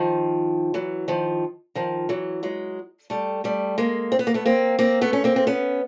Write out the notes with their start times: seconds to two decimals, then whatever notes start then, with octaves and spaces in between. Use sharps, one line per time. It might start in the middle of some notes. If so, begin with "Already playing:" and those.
Already playing: D#3 F3
0.74 E3 F#3
1.08 D#3 F3
1.75 D#3 F3
2.09 E3 F#3
2.43 F#3 G#3
3.10 G3 A3
3.44 G3 A3
3.78 G#3 A#3
4.12 C4
4.19 B3
4.27 A#3
4.34 A3 B3
4.45 A#3 C4
4.79 A#3 C4
5.01 A3 B3
5.13 C#4
5.24 A#3 C4
5.36 C4
5.47 B3 C#4